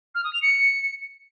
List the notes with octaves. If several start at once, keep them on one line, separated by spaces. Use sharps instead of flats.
F6
D#6
F7
C#7